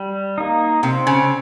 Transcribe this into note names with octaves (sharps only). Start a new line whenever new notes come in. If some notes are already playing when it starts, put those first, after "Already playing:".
Already playing: G3
A#3 D#4
C3 C4
C#3